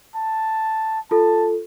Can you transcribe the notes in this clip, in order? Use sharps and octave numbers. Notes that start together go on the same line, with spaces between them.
A5
F4 A4 A5